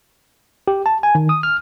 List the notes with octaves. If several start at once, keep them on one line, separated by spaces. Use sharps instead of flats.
G4
A5
G#5
D#3
D#6
F6